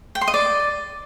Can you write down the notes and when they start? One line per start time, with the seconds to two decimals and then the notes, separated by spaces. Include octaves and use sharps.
0.15 G5
0.21 C6
0.28 D#5
0.34 D5